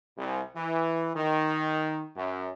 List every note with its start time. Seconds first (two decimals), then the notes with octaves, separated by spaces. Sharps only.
0.17 C2
0.56 E3
1.15 D#3
2.16 F#2